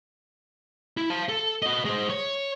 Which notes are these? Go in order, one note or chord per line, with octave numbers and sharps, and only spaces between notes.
E4
F5 A5
A4
F#4 D#5
G#3 C5
C#5